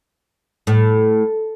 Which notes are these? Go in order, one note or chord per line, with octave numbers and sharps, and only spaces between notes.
A2